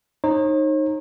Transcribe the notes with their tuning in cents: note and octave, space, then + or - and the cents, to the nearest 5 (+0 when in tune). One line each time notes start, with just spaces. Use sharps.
D#4 -10 C#5 -45